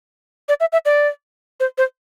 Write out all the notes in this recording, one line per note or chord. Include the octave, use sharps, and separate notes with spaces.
D5
E5
E5
D5
C5
C5